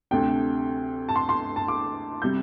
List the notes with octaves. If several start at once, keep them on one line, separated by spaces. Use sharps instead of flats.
D2 C3 A3 D4 G5
A5
C6
C6
A5
D6
C3 G3 G6